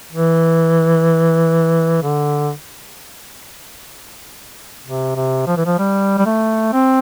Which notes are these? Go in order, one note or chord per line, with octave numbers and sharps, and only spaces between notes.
E3
D3
C3
C3
F3
E3
F3
G3
G3
A3
C4